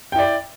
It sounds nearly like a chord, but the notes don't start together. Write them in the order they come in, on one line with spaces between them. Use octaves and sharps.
G5 E4 D5